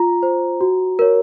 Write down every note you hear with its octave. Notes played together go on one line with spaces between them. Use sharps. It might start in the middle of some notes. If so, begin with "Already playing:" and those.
Already playing: F4 A#5
C5
F#4
A#4 C#5